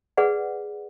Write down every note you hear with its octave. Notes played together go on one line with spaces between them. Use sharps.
G#4 B4 D5 F#5